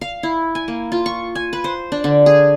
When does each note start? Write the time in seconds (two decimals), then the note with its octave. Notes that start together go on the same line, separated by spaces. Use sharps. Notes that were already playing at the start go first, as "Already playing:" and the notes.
0.01 F5
0.23 E4
0.55 G#5
0.68 A#3
0.92 F4
1.06 C#6
1.35 G#5
1.53 B4
1.64 C5
1.92 D4
2.04 D3
2.26 G#4